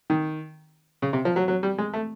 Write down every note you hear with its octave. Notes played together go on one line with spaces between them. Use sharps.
D#3
C#3
C3
F3
F#3
F#3
G3
G#3
A3